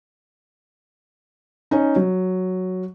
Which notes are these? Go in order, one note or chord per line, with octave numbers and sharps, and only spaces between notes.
C#4 D#4
F#3